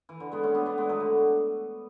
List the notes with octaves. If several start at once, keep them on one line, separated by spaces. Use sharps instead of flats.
E3
D3
G#3 B3
A3 C#4
B3 D4
B3 D4
G#3 B3
F#3 A3
D3